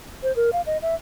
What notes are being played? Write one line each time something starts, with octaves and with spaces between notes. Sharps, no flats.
C5
A#4
F5
D#5
E5